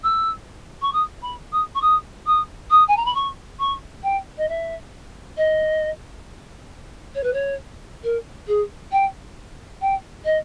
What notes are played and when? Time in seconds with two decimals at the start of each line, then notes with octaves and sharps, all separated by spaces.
0.03 E6
0.82 C#6
0.93 D#6
1.22 B5
1.52 D#6
1.75 C#6
1.81 D#6
2.26 D#6
2.70 D#6
2.88 G#5
2.97 A#5
3.05 B5
3.14 C#6
3.59 C#6
4.03 G5
4.37 D#5
4.48 E5
5.37 D#5
7.15 C#5
7.23 B4
7.33 C#5
8.03 A#4
8.47 G#4
8.92 G5
9.81 G5
10.24 D#5